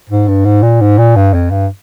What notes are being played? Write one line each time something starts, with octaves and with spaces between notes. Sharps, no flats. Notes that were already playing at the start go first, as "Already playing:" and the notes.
G#2
G2
G#2
A#2
G#2
A#2
G2
F2
G2